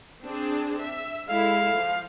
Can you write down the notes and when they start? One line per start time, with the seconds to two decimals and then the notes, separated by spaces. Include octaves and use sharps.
0.23 C4 D4 G#4
0.81 E5
1.29 G#3 E4 A4 F5
1.76 F3